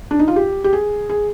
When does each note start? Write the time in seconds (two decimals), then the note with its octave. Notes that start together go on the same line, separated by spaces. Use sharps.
0.11 D4
0.19 D#4
0.28 F4
0.36 G4
0.64 G4
0.73 G#4
1.10 G#4